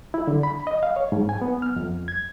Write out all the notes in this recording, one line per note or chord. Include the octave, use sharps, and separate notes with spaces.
E4
D3
B5
D#5
F5
C#5
G#2
G#5
B3
F6
F2
G#6